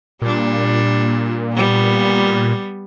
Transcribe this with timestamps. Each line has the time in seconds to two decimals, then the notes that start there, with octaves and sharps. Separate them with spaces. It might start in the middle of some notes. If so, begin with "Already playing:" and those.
0.22 A#2 G3 D4
1.52 G3 B3